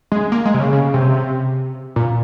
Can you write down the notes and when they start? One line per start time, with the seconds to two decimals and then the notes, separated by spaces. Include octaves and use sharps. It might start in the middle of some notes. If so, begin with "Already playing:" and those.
0.12 G#3
0.32 A#3
0.45 G#3
0.54 C3
0.59 C#3
0.73 C#3
0.94 C3
1.96 A#2